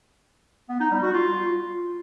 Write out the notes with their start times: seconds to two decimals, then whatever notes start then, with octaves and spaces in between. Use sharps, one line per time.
0.69 B3
0.80 D#4
0.91 G3
1.02 F#4
1.13 F4